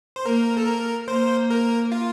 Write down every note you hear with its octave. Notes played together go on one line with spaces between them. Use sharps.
C5
A#3 A#4
A4
A#4
A#3 C5
A#4
F4